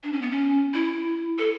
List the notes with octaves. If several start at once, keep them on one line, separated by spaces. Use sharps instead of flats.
D4
C#4
B3
C#4
E4
A4